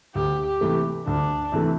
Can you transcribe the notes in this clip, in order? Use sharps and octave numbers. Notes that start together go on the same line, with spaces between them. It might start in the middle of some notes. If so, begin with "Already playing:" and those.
D2 G4
G4
C3 E3 A3
D2 D4
C3 E3 A3